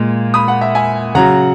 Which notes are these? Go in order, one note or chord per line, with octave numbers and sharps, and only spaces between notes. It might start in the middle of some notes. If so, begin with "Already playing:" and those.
Already playing: A#2 G#3
B5 D#6
F#5
E5
E5 G#5
C#3 F#3 F#5 A#5